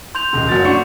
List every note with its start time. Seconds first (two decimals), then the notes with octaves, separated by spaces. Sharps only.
0.15 C6 G6 F7
0.33 D#1 C#2 C#3
0.49 F#1 F#3 A6
0.65 D4 F#4 C#6 C#7